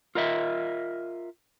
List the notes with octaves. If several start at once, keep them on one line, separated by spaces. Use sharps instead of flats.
F4 A#4 D#5 E5